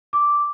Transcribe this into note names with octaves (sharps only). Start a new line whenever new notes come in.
D6